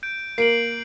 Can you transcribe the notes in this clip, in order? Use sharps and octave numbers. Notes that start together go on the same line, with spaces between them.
G6 D7
A#3 C7 D7 F#7